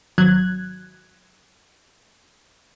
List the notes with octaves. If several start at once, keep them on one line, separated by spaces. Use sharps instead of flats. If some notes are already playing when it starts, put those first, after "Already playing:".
G#1 F#3 F#6 G#6